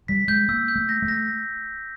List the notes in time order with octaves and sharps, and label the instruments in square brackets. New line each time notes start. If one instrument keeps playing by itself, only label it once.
[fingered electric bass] G3 [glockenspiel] B6
[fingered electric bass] G#3 [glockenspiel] G6
[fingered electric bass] A#3 [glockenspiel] E6
[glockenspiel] G6
[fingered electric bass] A3
[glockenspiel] A#6
[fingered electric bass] A3
[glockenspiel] A#6